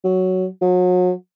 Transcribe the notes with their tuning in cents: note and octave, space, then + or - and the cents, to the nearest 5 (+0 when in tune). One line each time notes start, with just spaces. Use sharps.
F#3 +5
F#3 -35